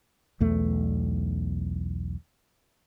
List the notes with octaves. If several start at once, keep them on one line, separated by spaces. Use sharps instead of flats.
B1 E2 A3